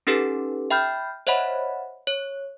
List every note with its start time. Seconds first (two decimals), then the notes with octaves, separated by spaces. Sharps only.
0.07 C#4 D#4 G4 A4 B4
0.71 E5 G5 B5 F6 G6
1.27 C5 C#5 D#5 E5 F#5 B5
2.07 C#5